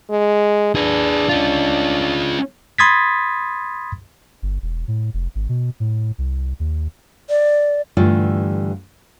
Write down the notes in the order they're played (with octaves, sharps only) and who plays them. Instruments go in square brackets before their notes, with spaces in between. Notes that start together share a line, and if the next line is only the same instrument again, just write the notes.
[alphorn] G#3
[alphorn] D4 [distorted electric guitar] G#4 B4
[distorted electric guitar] C#4 F4
[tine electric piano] B5 C6 D#6 G#6 A6 B6
[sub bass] G1
E1
A2
F1
G#1
B2
A2
C2
D#2
[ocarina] D5
[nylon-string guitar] G2 D3 E3 G3 A3 F4